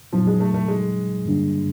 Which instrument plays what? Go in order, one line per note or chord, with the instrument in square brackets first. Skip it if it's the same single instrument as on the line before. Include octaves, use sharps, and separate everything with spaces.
[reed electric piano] A#2 F#3 B3 D#4 [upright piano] F3
[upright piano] G#3
A3
A3
G#3
[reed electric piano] G2 D3 G3 A#3 D4